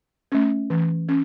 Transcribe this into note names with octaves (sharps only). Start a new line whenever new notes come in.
A3 C#4
E3
C#4